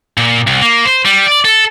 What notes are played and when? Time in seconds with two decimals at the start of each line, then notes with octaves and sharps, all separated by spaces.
0.17 A#2
0.47 C2
0.62 A#3
0.85 C5
1.05 G3
1.27 D5
1.45 A4